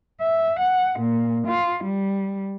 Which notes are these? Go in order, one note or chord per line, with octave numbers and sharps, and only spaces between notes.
E5
F#5
A#2
F4
G3